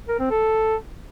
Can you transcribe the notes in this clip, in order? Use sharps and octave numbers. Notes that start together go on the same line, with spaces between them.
A#4
C4
A4